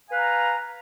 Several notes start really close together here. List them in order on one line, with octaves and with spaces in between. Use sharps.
G#5 F5 B4 A#5